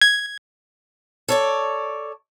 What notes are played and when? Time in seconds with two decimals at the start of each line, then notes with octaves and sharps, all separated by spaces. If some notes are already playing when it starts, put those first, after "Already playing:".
0.01 G#6
1.29 A4 C#5 D5